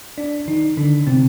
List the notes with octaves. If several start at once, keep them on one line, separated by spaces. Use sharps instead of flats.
D4 D5
D#3 D#4
D3 D4
C3 C4